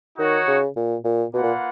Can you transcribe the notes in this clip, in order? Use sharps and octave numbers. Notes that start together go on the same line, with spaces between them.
D#3 D#4 F#4 C#5
C#3
A#2
A#2
B2 A#3 F4 B4 F#5
A#2